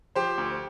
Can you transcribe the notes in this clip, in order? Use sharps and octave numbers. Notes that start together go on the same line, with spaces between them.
F3 G4 C5
D2